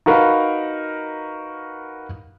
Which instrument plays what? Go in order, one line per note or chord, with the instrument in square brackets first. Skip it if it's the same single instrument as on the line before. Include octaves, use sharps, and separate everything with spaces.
[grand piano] D#4 F#4 A#4 B4 F5